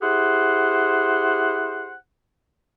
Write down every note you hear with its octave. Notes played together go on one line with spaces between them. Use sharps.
E4 G4 G#4 C5 F#5